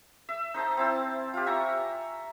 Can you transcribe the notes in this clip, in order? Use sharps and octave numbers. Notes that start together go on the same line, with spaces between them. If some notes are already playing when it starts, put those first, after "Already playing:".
E5
D#4 C5 D#5 A5
C4 E4 A5
F4 G4
E5 G#5 A#5 C#6